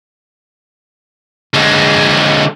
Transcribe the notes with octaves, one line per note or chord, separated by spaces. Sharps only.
D3 G#3